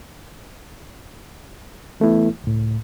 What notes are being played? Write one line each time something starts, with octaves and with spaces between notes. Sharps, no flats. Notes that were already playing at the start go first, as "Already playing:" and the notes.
E3 A3 B3 E4
C#2 A2